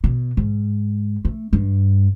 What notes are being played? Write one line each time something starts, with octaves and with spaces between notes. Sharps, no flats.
B2
G#2
A3
G2